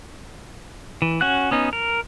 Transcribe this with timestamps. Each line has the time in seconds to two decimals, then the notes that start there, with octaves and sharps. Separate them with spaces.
1.02 E3
1.21 C#4 F#4 F#5 F#6
1.51 B3 C#4 D#4
1.73 A#4